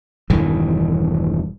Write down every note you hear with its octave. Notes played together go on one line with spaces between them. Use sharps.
E1 G2 D#3 E3